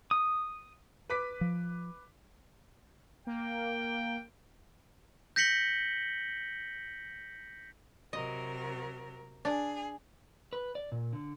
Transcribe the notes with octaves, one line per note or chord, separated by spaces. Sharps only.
D#6
B4 D6 B6
F3
A#3 G5
G6 A#6 B6 C#7 F#7 G7
C3 F#3 A#4 D#5
D4 G#4
B4
D5
A#2
D3